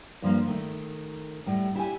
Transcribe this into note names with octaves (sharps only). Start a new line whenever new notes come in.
G2 F3 G#3 A#3
D#3 A3
A2 G3
E4 G4 G5 G#5